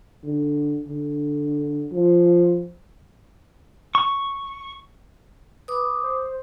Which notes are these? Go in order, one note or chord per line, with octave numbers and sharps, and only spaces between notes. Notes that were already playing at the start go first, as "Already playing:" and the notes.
D3
D3
F3
C#6
B4 D6 D#6
C5